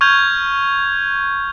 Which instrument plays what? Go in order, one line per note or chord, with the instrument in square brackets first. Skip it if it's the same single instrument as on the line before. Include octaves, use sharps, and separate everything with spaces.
[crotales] C#6 F6 G6 G#6 F7